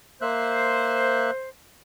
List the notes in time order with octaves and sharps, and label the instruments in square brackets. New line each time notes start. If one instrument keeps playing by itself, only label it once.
[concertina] A#3 E5 F#6 [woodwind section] C5